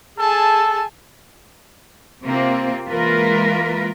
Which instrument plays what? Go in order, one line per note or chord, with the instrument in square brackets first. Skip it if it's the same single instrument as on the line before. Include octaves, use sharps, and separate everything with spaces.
[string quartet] G#4 G#5 A5 [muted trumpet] A4
[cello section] C3 A#3 C4 F4
E3 G#3 A#3 F4 A#4 B4